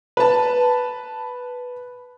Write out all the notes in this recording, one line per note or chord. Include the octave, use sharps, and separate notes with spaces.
B4 A5